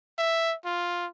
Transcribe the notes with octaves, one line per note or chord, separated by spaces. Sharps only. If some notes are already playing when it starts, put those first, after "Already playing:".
E5
F4